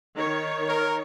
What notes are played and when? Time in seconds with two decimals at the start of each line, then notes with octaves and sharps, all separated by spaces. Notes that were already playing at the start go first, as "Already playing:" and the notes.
0.16 D#3 C#5
0.68 A#4